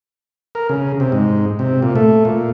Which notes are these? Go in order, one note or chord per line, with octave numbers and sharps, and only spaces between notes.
A#4
C#3
C3
G#2
C3
A#2
A3
A#2